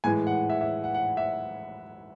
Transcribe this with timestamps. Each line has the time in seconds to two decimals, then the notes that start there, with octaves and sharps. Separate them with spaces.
0.04 A2 E3 G#3 G#5
0.27 F#5
0.50 E5
0.61 E5
0.84 F#5
0.94 F#5
1.17 E5